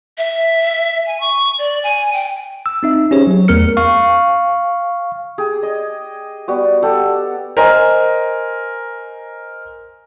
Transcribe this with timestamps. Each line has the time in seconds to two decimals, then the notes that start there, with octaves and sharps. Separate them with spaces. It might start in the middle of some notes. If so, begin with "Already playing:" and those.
0.18 E5
1.06 G#5
1.20 C#6
1.58 D5
1.83 G#5
2.13 G5
2.66 E6
2.83 C4 D#4 E5
3.11 C#4 G4 G#4 C5 C#5
3.27 F#3 C#5
3.48 E2 A3 B3 A#4 F6 C#7
3.77 F5 C#6
5.38 G4 G#4
5.63 D#5
6.48 G3 B3 F#4
6.83 G4 A4 F#5
7.57 A#4 C5 D#5 G#5 A#5